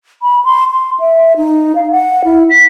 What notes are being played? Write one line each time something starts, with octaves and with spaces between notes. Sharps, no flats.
B5
C6
C6
E5
D#4
F5
F#5
E4
B6